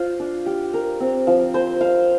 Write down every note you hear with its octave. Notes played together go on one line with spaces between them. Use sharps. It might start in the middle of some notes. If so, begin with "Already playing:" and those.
Already playing: F4 C5
D4
G4
A#4
C4
F3
C5
F5